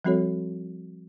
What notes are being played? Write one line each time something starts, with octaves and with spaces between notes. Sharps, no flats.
F3 G3 C4 F#4 A4 C#5